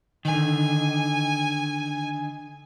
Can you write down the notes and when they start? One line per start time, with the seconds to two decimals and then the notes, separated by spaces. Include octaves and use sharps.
0.25 D3 D#3 G#5